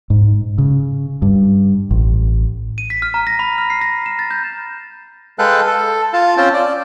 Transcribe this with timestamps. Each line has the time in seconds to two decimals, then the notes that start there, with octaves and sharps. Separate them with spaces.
0.10 G#2
0.58 C#3
1.22 G2
1.91 A1
2.78 D#7
2.90 B6
3.02 F6
3.14 A#5
3.27 A#6
3.39 B5
3.58 F6
3.70 C7
3.81 A#6
4.06 E7
4.19 A6
4.31 G6
5.39 G#3 A4 B4 F5 G5 F#6
5.67 A4
6.13 F4 F5 A5
6.37 C4 C#4 F4 C5 G5 A5
6.54 D5